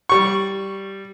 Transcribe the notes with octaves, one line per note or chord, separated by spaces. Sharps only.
G3 C#6